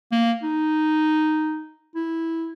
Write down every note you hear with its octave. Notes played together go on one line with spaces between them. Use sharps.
A#3
D#4
E4